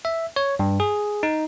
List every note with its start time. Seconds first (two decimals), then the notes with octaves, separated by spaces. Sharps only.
0.05 E5
0.36 C#5
0.59 G2
0.80 G#4
1.23 D#4